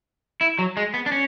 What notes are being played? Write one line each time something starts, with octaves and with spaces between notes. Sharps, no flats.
E4
F#3
G#3
B3
D4
C#4